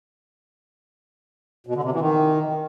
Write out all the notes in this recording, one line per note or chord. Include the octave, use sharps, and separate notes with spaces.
B2
D3
C3
E3
D#3